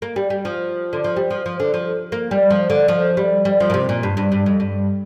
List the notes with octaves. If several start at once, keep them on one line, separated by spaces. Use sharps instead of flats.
A#3
G3
G3
F3
D3
F3
G3
F3
F3
D3
F3
A#3
G3
F3
D3
F3
G3
G3
F3
A#2
C3
A#2
G2
G2
G2
F2
G2